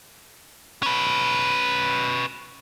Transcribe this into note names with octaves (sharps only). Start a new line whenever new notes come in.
C#4 B4